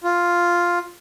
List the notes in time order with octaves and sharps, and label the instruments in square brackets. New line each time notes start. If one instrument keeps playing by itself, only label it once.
[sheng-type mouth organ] F4